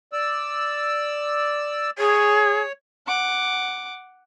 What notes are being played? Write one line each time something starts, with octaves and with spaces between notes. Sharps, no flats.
D5 E6
G#4 C#5
F#5 D6